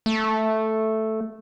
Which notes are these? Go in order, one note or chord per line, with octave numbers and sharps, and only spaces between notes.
A3